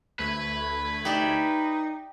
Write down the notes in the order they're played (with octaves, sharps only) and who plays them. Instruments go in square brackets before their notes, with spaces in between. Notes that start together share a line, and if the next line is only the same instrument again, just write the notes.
[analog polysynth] D2 A3 G#6 [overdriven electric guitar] B4
[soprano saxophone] D#4 [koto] G4 D5 E5